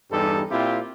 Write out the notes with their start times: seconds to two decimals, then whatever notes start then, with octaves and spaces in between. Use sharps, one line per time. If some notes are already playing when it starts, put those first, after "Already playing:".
0.11 E2 G2 G3 D#4 A4
0.50 A#2 C4 E4 F4 G4